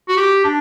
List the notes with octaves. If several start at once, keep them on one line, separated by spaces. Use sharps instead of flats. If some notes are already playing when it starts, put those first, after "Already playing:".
F#4
G4
D4